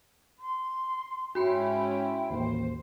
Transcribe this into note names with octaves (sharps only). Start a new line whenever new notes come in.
C6
G#2 C#4 E4 F#4 G5 B5 C6
A1 D#2 C5